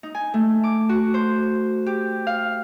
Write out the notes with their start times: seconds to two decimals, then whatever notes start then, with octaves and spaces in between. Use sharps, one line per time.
0.03 D#4
0.15 G#5
0.34 A3
0.64 D6
0.89 F#4
1.14 C5
1.86 G4
2.27 F5